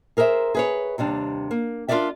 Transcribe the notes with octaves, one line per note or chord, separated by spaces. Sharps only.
G#4 A#4 C5 C#5 E5
G#4 B4 C#5
D#2 C3 G3 D4
A#3
D4 F4 G4 A#4 D5 E5